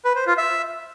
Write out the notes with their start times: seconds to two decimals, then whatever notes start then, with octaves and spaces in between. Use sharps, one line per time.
0.05 B4
0.16 C5
0.27 F4
0.38 E5